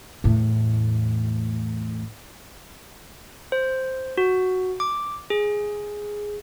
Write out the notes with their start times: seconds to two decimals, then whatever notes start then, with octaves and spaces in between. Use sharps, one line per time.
0.24 E2 A2
3.52 C5
4.18 F#4
4.80 D6
5.30 G#4